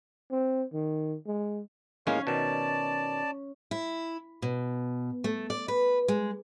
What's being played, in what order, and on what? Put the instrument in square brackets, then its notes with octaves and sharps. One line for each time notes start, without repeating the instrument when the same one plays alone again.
[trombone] C4
D#3
G#3
[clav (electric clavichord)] A2 G#3 A#3 [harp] C#4 [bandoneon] C#5 F5
[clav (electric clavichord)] B2 D#3 [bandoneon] D5 A5
[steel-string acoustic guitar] E4
B2
A3
D5
B4
G#3